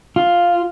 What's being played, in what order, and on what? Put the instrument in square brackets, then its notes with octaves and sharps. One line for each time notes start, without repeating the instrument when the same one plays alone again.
[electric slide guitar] F4